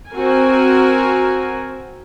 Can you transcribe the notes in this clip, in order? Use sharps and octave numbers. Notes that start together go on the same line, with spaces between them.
C4 F#4 A#4 G#5